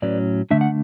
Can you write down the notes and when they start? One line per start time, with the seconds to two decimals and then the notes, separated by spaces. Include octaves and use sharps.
0.02 A2 F#3 C#4 B4 D5
0.51 D3 A3 D4 E5
0.61 F#5